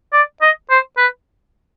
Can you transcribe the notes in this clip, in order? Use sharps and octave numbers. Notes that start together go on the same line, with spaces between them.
D5
D#5
C5
B4